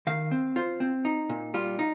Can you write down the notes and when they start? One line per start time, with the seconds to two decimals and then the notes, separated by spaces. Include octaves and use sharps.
0.07 D#3 F5
0.31 C4
0.56 F4 C5
0.80 C4
1.05 D#4
1.29 A#2
1.54 G3 F4
1.79 D#4